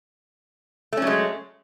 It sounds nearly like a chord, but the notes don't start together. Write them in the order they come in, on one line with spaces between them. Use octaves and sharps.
A3 C#4 F#3 G#3